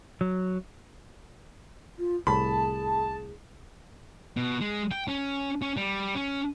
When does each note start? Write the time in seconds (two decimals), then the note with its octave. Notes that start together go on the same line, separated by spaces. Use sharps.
0.21 F#3
1.99 F4
2.27 C2 A2 G#4 A5 B5
4.36 B2
4.61 G#3
4.91 G5
5.08 C#4
5.62 C#4
5.77 G3
6.15 C#4